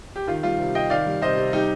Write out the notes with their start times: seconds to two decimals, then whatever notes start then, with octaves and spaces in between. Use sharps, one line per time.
0.16 G4
0.27 D#3 F4
0.43 G3 F4
0.58 C3
0.75 C3 D#5 G5
0.90 D#3 D5 F5
1.06 G3
1.22 C3 C5 D#5
1.37 C3
1.53 G3 D#4 G4